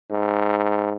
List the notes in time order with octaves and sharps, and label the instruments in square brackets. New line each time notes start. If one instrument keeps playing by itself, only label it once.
[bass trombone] G#2